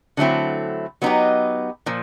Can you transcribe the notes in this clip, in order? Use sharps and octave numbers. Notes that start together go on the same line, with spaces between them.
D3 F#3 A3 C4 E4
F#3 B3 D#4 G4
A#2 F3